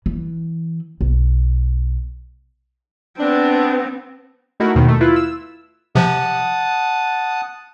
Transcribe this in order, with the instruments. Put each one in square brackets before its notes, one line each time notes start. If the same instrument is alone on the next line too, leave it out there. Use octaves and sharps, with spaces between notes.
[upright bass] E3
B1
[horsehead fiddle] B3 C4 [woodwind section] D4
[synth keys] A3 D#4 E4 F#4 A#4
D#2 B2 D#3
A3
E4 F4 B4
E6
[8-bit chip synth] C3 F3 [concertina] F#5 A5 D#6